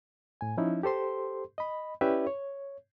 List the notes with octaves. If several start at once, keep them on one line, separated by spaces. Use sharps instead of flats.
A2 G#5
F3 C#4 D#4 E4
G4 A4 C5 C6
D#5 B5
C#4 E4 G4 B4 D5 E5
C#5